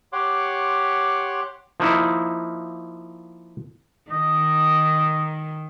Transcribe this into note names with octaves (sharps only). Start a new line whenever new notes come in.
G4 C#5 F#5 C6 D6
F3 A#3 D#4 E4
D#3 D#5